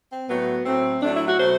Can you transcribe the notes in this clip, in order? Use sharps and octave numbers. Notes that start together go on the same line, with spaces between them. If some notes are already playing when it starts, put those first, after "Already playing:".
C4
A2 F#3 A3 B3
A2 F#3 A3 C4
A2 F#3 A3 D4
E4
F#4
B2 F#3 A3 C5